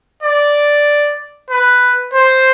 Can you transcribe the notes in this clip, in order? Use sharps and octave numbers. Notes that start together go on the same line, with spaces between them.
D5
B4
C5